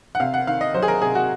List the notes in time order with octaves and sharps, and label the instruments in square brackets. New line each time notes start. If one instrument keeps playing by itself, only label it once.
[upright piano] F#5
C3 F5
F#5
D#3 F5
D#5
F#3 C5
G#4
A#4
C3 G#4
F#4